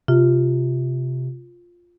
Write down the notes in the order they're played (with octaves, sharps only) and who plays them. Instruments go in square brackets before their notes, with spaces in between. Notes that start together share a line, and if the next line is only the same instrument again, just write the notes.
[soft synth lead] C3 [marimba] F4